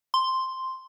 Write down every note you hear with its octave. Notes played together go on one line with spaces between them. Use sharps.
C6